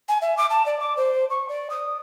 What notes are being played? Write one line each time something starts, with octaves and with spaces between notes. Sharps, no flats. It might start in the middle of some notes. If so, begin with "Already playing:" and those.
G#5
E5
D6
A5
D5
D6
C5
C#6
D5
D#6